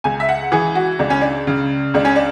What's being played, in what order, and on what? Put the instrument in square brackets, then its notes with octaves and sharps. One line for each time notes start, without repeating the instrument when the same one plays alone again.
[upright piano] C#2 G#5
E5
F#5
E3 G#4
F#4
C#2 D4
C#4
D4
C#3
C#2 D4
C#4
D4